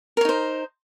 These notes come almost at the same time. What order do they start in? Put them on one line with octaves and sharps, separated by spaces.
A#4 C#5 D#4 C5